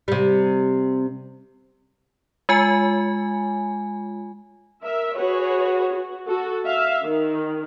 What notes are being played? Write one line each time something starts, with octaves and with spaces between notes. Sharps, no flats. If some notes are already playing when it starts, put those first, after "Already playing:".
C3 G3
G#3 F4 G#5
A#4 E5
F#4 G#4 B4 C#5
F#4
F#4 A4
E5 F5
D#3